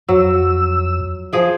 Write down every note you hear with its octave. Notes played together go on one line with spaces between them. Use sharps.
F2 F#3 E6
F3 G#4 G5